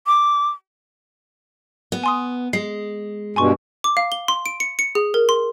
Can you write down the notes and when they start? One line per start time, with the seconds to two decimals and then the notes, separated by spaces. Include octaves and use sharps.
0.07 D6
1.92 B3
2.04 G#5 C6 D#6
2.53 G#3 C7
3.36 G2 B2 G#5 C6 C#6
3.84 D6
3.97 F5
4.12 G7
4.28 C6
4.46 D7
4.60 C#7
4.79 C#7
4.95 G#4
5.14 A#4
5.29 C6